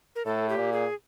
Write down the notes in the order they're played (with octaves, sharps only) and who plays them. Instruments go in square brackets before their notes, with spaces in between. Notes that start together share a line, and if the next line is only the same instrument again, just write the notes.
[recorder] A#4
[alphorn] A2 [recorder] A4
[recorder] G4
[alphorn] A#2
[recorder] G#4